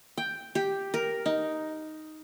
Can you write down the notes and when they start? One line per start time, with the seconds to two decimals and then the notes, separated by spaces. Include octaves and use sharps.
0.18 G5
0.55 G4
0.94 A#4
1.26 D#4